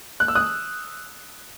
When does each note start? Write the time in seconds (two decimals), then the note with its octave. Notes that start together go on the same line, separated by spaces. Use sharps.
0.20 F#6
0.28 E6
0.35 D#6 F#6